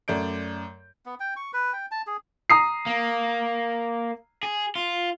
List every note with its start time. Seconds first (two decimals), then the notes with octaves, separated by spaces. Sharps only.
0.08 F#2 A3 D5 G6 D7
1.06 B3
1.20 G5
1.36 C#6
1.53 B4
1.73 G5
1.91 A5
2.07 G#4
2.50 A#5 D#6 C7
2.86 A#3
4.43 G#4
4.75 F4